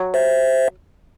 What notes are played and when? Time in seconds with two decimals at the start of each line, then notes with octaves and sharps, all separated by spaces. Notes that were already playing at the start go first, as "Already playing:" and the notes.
Already playing: F#3
0.14 C5 E5